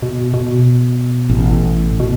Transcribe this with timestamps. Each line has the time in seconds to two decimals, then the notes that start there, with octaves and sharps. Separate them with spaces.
0.02 B2
0.34 B2
1.29 A1
2.00 B2